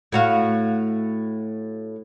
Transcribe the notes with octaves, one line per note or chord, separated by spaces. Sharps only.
A2 F#4 F5